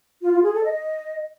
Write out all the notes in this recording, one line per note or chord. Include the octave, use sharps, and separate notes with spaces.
F4
F4
G#4
A4
D#5